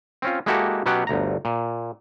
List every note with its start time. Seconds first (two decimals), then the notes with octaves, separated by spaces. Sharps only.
0.22 C4 C#4 F4
0.46 G#3 A#3 E4 F#4 G4 A4
0.86 B2 F#3 B3 C#4 G4 F#5
1.07 G1 D2 A#5
1.45 A#2